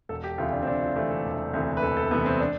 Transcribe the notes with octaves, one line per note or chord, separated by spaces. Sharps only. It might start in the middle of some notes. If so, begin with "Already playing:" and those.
E1 A4
G4
D2 C3 E3 A3 F4
D4
C4
E1 D4
F4
D2 C3 E3 A3 G4
A4
E1
D2 C3 E3 A3
B4
E1 A4
A4
D2 C3 E3 A3 B3
C4
D4